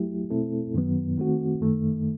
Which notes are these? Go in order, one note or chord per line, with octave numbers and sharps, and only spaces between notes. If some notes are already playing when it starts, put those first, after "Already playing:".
Already playing: F#3 A3 E4 G4
B2 A3 C4 E4 A4
F#2 D#3 F#3 B3
D#3 A3 C4 F#4
F#2 D#3 A3